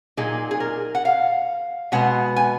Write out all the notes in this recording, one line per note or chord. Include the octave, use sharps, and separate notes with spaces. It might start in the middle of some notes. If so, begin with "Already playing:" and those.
A#2 F#3 A#3 D#4 G#4
G#4
A#4
F#5
F5
B2 G#3 B3 F#5
G#5